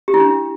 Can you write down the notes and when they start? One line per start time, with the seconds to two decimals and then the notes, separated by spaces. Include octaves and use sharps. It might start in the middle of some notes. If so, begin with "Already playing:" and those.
0.08 G4
0.14 E4
0.20 D4